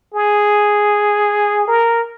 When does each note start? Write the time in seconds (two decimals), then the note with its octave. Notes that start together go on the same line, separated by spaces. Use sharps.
0.14 G#4
1.68 A#4